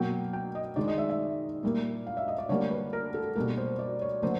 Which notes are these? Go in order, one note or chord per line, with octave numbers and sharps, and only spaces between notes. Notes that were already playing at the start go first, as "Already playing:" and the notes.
Already playing: B2 F#3 A#3 G5
G5
D#5
D#3 G#3 D5
D#5
E5
E5
A#2 G3 A#3
F5
E5
D#5
D5
D3 G3 A#3 C#5
B4
A#4
A4
B2 G3 A#3 A#4
C5
D5
C#5
D3 F#3 A#3 C5